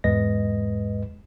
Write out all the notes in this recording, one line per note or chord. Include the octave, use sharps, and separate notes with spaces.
E2 G#2 G#3 B4 D#5 A#6